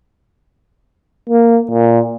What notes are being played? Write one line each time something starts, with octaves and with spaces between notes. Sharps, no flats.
A#3
A#2